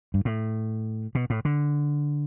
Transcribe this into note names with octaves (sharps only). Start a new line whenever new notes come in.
G2
A2
B2
A2
D3